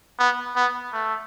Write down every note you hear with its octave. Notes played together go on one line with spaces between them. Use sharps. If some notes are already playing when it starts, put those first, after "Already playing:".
B3
B3
A3